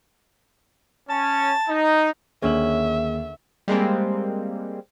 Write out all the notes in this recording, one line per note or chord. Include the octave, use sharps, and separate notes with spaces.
C#4 C#5 A5
D#4
D#2 D3 A#3 C#4 G#4 E5 F#7
G3 G#3 A#3 C4